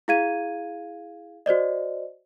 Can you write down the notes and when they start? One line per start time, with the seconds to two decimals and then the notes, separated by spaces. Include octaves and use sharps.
0.08 E4 G#4 F5 G#6 D#7
1.46 F#4 C5 D5 D#5